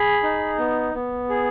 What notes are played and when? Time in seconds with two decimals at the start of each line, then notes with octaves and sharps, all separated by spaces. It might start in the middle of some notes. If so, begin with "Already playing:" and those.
Already playing: G#4 B5
0.23 D#4
0.58 B3
0.94 B3
1.30 G#4